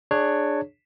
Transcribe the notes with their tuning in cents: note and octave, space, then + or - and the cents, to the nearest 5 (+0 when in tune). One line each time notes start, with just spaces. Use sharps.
D4 +15 G#4 +0 C#5 +0